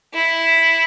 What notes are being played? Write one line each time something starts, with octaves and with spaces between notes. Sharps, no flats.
E4